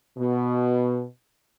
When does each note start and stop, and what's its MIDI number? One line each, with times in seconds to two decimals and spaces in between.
0.18 1.03 47